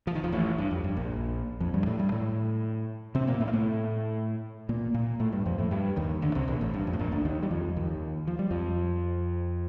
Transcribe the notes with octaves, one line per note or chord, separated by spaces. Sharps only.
F3
D#3
F2 F3
A1 A2
G2
F2
G2
A#1 A#2
F2 F3
G2 G3
A2 A3
G2 G3
A2 A3
C3 C4
A#2 A#3
A2 A3
A#3
A2 A3
A#2 A#3
A#2 A#3
A2 A3
G2 G3
F2 F3
A2 A3
G2 G3
D#2 D#3
D2 D3
C2 C3
A#1 A#2
A1 A2
G2
F2
A2
A#1 A#2
D2 D3
D#2 D#3
G3
F2 F3
D#2 D#3
F3
G3
F2 F3